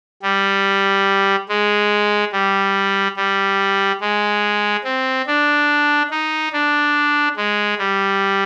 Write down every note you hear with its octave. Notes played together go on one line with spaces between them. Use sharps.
G3
G#3
G3
G3
G#3
C4
D4
D#4
D4
G#3
G3